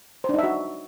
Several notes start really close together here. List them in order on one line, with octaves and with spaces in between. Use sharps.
C5 D4 D#4 E5 F#4